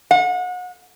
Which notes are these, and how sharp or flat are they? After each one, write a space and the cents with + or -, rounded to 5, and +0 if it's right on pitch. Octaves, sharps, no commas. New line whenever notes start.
F#5 -35